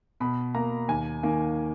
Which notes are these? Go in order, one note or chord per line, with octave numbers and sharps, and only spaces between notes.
B2 B5
A#3 A#5
D#2 G#5
D#3 A#3